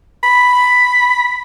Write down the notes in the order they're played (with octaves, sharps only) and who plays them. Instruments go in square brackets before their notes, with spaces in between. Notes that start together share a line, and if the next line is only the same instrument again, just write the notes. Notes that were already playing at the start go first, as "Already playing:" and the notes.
[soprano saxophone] B5